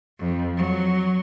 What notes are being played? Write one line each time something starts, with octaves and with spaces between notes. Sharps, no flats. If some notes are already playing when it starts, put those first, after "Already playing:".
F2
F#3